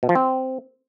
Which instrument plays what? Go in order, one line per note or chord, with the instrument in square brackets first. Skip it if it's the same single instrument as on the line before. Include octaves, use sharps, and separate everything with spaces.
[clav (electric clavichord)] B2
F3
C4